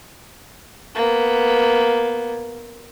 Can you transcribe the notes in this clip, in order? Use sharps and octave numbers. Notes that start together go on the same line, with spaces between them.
A#3 B3